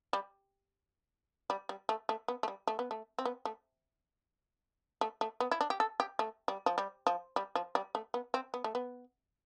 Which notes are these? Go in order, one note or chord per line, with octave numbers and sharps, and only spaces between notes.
G3
G3
G3
A3
A3
B3
A3
G3
A3
B3
A3
C4
B3
A3
A3
A3
B3
E4
D4
G4
A4
G4
A3
G3
F3
G3
F3
G3
F3
G3
A3
B3
C4
B3
A3
B3